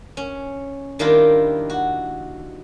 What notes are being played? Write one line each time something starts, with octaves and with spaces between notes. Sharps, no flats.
C#4
D#3 G3 A#3 D4 E4 F4
F#4